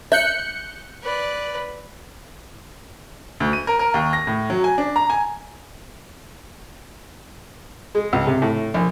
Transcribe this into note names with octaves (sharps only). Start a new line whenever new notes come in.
E5 F#6 G6 C#7
B4 D5
D2
D#7
A#4
A#4
D#2
A#6
A2
F#3
G#5
D4
A#5
G#5
G#3
C#2
C3
A2
A#1